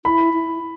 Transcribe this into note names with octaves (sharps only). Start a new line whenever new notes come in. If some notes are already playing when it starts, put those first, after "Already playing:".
E4 B5
E4